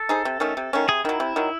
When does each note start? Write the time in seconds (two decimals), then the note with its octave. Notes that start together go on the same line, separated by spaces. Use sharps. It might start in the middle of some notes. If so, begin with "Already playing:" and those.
Already playing: A4
0.09 D#4 G#4 C5
0.25 C3
0.40 D#3 A3 C#4
0.57 C3
0.73 D#3 A3 C#4
0.88 C3 G#4
1.04 D#3 F#3 E4
1.20 C3
1.36 D#3 F#3